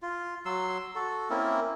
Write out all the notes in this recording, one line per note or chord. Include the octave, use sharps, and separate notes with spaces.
F4
F#3 C6 E6
F#4 A4
A#3 C4 C#4 E4